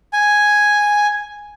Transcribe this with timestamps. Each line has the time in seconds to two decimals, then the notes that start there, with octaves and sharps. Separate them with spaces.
0.13 G#5